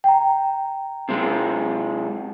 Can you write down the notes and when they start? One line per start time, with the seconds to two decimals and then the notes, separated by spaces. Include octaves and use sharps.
0.04 G5 A#5
1.09 C3 G#3